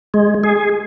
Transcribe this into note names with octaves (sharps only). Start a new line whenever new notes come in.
G#3
G#4